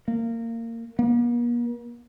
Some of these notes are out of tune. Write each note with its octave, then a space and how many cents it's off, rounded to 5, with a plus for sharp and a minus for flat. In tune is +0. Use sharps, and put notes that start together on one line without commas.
A#3 -20
A#3 +45